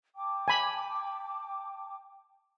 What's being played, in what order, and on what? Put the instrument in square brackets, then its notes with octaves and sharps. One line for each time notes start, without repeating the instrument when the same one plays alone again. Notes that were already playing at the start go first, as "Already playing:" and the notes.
[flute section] G5 A5 D6
[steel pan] G#5 B5